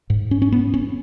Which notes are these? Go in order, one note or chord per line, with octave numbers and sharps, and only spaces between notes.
G#2
C#4
C#4
B3
C#4